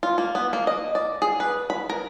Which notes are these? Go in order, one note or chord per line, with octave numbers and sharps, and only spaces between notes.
F4
A#3
B3
A#3
D#5
D5
G#4
B4
B5
A#4